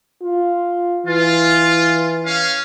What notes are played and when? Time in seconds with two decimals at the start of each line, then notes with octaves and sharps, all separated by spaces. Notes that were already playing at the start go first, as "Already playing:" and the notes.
0.22 F4
1.06 E3 F4
2.24 C#4 F5